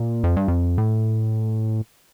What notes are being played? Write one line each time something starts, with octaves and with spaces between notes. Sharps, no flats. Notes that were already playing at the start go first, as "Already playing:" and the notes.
Already playing: A#2
F2
G2
F2
A2